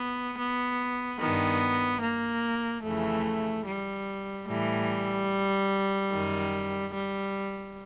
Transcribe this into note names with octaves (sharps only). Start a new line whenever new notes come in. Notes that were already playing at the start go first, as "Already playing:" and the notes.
Already playing: B3
B3
G2 D#3 B3
A#3
F2 C#3 E3 A3
G3
A2 E3 G3
F#2 D#3
G3